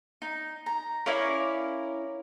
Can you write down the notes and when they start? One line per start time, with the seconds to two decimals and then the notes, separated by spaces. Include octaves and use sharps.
0.22 D#4
0.66 A#5
1.06 C#4 E4 A#4 D5 F5 D6